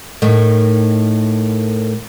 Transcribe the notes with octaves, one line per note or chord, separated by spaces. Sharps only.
A2 D#3